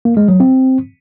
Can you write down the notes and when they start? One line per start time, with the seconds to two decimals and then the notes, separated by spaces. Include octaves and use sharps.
0.05 A#3
0.17 G#3
0.28 F#3
0.40 C4